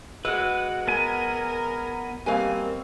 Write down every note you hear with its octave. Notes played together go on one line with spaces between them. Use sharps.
G#3 F#4 B4 E6
B3 A#4 G#5
B2 G3 A#3 C4 F5 G#5